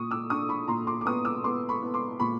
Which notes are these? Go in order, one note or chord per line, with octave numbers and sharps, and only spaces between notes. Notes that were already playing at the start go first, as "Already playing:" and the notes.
Already playing: A#2 C#6 D#6
D6 E6
D4 C#6 D#6
B5 C#6
A#2 A#5 C6
C6 D6
D6
B3 C#6 D#6
D6 E6
B3 C6 D6
B5 C#6
B3
C6 D6
A#2 B5 C#6